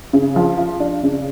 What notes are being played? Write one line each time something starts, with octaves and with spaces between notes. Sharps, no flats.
C#3
F3
F4
D4
C#3